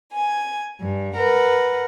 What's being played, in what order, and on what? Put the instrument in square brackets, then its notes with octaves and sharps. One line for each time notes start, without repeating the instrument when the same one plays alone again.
[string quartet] G#5 G#6
G2
A#4 B4 F#5